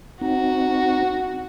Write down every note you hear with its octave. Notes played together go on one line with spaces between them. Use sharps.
C4 D#4 F#4